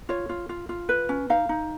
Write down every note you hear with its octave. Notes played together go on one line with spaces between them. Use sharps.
F4 C#5
F4
F4
F4
B4
C#4
D#4 F5
D#4